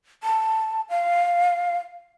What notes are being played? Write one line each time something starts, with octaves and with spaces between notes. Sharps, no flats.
A5
F5